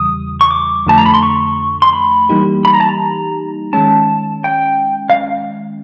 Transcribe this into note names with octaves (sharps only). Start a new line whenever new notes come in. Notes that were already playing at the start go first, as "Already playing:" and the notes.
Already playing: E2 C#3 E3 G3 D#6
C#6
D6
F2 D3 F3 A3 A5
A#5
B5
C6
C#6
C6
B5
E3 G3 A#3 D#4 G4
B5
A#5
A5
A#5
D#3 G#3 C#4 A5
G5
F5